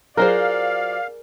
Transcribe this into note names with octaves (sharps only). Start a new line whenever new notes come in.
F#3 F4 G#4 A#4 C5 D5 F5